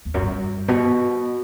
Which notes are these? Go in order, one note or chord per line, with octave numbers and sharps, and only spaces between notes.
E2
F#2
G2
B2